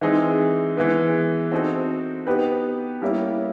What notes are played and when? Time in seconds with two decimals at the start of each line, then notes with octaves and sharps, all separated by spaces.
0.01 E3 G#3 C4 D#4 G#4
0.77 E3 G#3 B3
1.52 C4 D#4 F#4 A4 C5
2.27 B3 D#4 G4 B4
3.02 G3 A#3 C#4 E4 G4